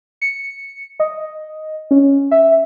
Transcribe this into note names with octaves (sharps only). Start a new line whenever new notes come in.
C#7
D#5
C#4
E5